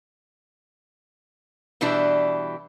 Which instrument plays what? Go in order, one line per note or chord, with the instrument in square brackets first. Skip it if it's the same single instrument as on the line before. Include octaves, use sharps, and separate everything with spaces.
[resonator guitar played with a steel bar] B2 E3 G3 D4 E4